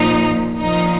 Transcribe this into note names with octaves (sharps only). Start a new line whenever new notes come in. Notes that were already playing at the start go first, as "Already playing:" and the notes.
Already playing: A#2 F3 D#4
A#2 F3 D#4